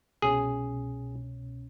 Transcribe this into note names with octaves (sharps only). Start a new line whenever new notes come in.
C2 B2 C#4 G#4